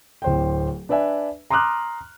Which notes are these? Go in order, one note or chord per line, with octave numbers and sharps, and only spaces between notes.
D1 C5 G5
D4 B4 D5 E5 G#5
A#5 C6 D6 D#6 F6 F#6